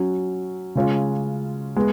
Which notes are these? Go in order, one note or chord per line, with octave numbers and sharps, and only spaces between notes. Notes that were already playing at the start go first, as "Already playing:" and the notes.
Already playing: F#3 C#4 F#4
C#3 G#3 C#4 F4
G#3 B3